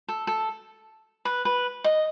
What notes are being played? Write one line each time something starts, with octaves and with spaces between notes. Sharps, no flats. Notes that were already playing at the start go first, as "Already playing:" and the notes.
A4
A4
B4
B4
D#5